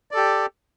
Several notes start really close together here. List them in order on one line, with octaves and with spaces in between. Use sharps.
D5 A4 G4